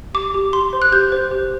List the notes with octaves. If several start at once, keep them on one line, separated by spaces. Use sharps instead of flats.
G4 D6
G4
G4 C6
C5
F#6
G4 G6
C5
G4